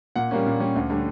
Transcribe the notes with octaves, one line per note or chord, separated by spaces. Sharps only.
A#2 F#5
G3 A#3 C#4
A#2
G3 A#3 C#4
D2
D3 G3 C#4